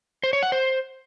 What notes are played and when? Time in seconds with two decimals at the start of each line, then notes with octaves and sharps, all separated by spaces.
0.23 C5
0.33 C#5
0.43 F#5
0.52 C5